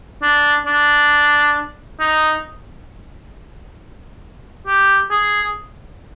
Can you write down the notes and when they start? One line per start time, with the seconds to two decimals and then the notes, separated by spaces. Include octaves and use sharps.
0.22 D4
0.66 D4
2.00 D#4
4.67 G4
5.11 G#4